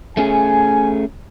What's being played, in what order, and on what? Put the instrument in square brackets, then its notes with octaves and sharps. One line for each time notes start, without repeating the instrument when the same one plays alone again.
[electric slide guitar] A3 C#4 G#4 [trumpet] G#5